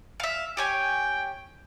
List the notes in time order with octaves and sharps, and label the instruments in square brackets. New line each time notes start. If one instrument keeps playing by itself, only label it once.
[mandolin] E5 F5
[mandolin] G4 C#5 G#5 [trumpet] G5